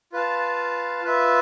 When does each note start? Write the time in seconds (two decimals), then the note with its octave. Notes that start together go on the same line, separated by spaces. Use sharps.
0.12 F4 B4 F5 A5
1.02 F4 B4 E5